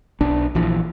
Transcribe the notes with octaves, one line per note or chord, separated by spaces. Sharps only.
B1 D4
A#1 E3 F3